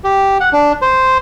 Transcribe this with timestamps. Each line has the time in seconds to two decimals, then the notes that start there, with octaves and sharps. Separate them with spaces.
0.04 G4
0.41 F#5
0.53 D4
0.82 C5